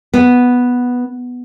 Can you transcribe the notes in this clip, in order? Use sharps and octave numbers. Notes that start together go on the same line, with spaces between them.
B3